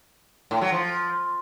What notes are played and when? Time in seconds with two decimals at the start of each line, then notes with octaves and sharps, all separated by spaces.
0.51 A2
0.61 F#3
0.72 F3